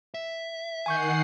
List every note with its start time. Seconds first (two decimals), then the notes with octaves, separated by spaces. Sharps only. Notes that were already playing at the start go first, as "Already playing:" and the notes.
0.14 E5
0.86 D#3 F#5 G#5 C#6 G6 C7